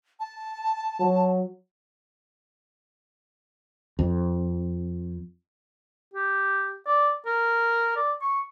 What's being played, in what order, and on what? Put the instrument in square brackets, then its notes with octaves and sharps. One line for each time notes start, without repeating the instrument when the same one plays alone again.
[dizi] A5
[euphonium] F#3
[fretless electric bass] F2
[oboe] G4
D5
A#4
D5
C#6